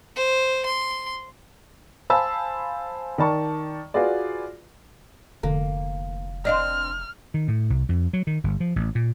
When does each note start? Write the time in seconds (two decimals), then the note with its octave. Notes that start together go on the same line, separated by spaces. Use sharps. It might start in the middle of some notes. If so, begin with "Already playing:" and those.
0.16 C5
0.65 C6
2.10 C5 F5 G#5 A5 B5 E6
3.18 D#3 D5 A5 C#6
3.94 F4 F#4 G#4 B4 D5
5.43 F1 D3 A#3
6.45 C4 D4 C5 D5 D#5 F5 F6
7.34 D#3
7.48 A2
7.70 C2
7.89 F2
8.13 F#3
8.27 D#3
8.44 G1
8.60 F3
8.76 A1
8.95 A#2